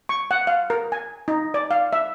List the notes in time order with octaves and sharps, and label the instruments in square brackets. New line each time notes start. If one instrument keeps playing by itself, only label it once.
[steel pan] C#6
F#5
F5
A#4
G#5
D#4
D5
F5
E5